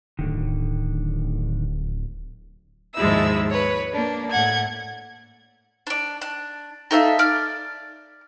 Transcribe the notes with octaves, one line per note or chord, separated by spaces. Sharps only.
D1 A2 D3 D#3
D#2 G#2 F3 G#3 E4 E6
B4 C#5
A#3 D4
A2 F#5 G#6
D4 D5
D4
D#4 A4 E5 F5
D5 F6